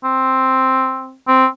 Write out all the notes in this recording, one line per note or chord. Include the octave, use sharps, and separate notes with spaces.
C4
C4